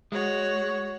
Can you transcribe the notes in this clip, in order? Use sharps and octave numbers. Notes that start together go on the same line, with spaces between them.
G#3 F#4 C#5